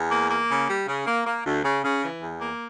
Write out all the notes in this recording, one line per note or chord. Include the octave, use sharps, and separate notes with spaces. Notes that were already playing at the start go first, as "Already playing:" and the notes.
Already playing: E2
A#3
A#3
C#3
G3
C#3
A#3
A#3
D2
C#3
C#3
E3
E2
A#3